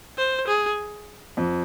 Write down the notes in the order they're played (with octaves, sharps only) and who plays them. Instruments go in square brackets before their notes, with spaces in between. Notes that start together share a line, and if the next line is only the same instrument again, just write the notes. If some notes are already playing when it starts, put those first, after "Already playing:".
[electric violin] C5
G#4
[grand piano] F2